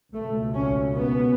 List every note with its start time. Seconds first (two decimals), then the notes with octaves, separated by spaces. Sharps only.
0.14 C#2 B2 A3
0.54 C#4
0.93 B3